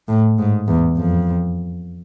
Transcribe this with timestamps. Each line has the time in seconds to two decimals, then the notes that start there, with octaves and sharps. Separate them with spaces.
0.08 A2
0.38 G#2
0.68 E2
0.97 F2